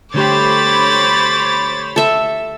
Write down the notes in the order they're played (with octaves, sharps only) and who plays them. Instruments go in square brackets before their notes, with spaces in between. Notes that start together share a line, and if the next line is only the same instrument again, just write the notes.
[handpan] D3 A3 G4 [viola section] C5 C#5 B5 [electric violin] D6 A6
[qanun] A4 E5